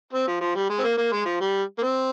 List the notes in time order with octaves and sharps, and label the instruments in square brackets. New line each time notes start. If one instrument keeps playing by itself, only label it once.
[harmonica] C4
F3
F3
G3
G#3
C4
A#3
A#3
G#3
F3
G3
A#3
C4